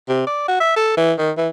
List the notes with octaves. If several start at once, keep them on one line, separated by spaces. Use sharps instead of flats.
C3
D5
F#4
E5
A4
E3
D#3
E3